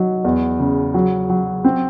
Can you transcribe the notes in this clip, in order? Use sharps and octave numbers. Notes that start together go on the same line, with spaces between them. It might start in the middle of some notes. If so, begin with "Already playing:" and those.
Already playing: F#3 D#4
E2
C#3
F#3
F#3
C4